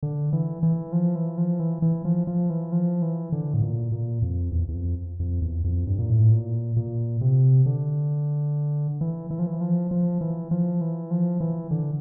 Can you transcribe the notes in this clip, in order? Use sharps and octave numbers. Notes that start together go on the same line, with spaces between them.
D3
E3
E3
F3
E3
F3
E3
E3
F3
F3
E3
F3
E3
D3
A2
A#2
A#2
F2
E2
E2
F2
F2
E2
F2
G2
A#2
A2
A#2
A#2
C3
D3
E3
E3
F3
E3
F3
F3
E3
F3
E3
F3
E3
D3